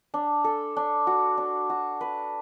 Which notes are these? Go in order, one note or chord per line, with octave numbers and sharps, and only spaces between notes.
D4
A4
D4
F#4
D4
F#4
B4